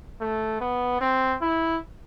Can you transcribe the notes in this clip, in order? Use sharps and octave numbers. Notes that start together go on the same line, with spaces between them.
A3
B3
C4
E4